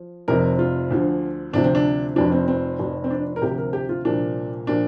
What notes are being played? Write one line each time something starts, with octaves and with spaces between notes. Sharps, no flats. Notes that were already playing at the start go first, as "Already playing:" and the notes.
Already playing: F3
F1 F2 C3 F3 A#4
F4
D2 D3 F3
D2 C3 F3 D4
C4
D4
F1 F2 F3 D4
C4
C4
F1 F2 F3
C4
D4
A#4
D2 C3 F3 G4
A#4
G4
F4
C2 A#2 F3 D4
A#2 F3 D4